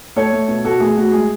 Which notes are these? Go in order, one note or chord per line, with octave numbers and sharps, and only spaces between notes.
A3 A4 C#5
A3
B2
B2 F#4 A4
A3 G#4
A3 F#4
G#3 G#4